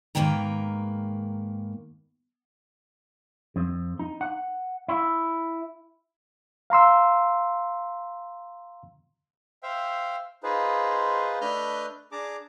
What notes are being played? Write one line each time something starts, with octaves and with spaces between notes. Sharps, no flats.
G#2 D#3 A#3 B4 G5 A#5
F2
D#4
F#5
E4
F5 A#5 C6 E6
C5 E5 F5 G5
D#4 F4 G#4 B4 C5
A3 D4 B4 D#5 F6 G6
D4 G#4 A5 A#5 D6